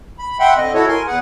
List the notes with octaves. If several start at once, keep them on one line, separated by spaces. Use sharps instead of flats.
B5
E5 F#5 G5 B5 C6
D3 C4 D#5
E4 F#4 A4 C#5
A#4 G#5 C6
E2 G#4 B4 F#5